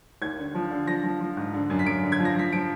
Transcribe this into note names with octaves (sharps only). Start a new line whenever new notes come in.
D#2 G#6
D3
F3
D3
F3 A#6
F3
F3
G#2
D3
F#2
B6
F#2 D7
D3
G#6
F3
A#6
F3 B6
F3 D7